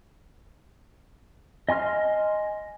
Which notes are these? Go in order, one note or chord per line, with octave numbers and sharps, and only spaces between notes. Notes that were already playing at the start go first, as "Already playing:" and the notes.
D#5 G#5 C6 F6